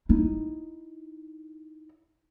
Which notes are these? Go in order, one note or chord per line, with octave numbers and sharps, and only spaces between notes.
D#4 E4